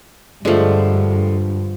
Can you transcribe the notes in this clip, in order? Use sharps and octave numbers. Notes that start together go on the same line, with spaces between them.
G2 D3 F3 G#3 A3